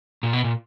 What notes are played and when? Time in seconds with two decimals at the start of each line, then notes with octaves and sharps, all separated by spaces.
0.23 A#2
0.33 B2
0.44 A#2